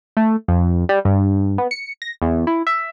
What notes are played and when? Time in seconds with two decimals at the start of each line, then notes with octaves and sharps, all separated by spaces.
0.17 A3
0.48 F2
0.89 G3
1.05 G2
1.58 B3
1.71 C#7
2.02 A#6
2.22 E2
2.47 E4
2.67 E5